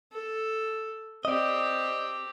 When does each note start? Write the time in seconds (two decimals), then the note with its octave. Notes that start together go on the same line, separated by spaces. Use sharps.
0.12 A4
1.25 C4 G4 D5 D#5